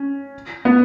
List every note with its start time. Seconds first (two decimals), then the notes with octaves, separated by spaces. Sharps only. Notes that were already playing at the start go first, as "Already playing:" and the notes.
Already playing: C#4
0.65 B3